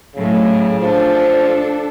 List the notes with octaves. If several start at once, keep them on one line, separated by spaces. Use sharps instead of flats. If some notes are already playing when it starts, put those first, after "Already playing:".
A2 C#3 F#3
F3 D4 A4